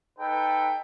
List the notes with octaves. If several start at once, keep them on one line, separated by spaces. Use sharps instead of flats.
D#4 A4 B4 G5